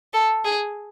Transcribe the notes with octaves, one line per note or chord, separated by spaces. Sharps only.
A4
G#4